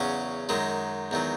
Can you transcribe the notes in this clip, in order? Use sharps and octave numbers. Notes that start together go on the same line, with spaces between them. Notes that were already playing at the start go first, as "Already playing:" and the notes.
Already playing: E2 C#3 F#3 C#4
F#2 D#3 F#3 G#3
E2 D#3 F#3